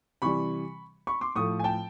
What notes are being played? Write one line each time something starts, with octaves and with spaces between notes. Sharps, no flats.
C3 E3 G3 B5 C#6
B5 C#6
C6 D6
A2 F3 A3 C#6 D#6
G#5
G5 A5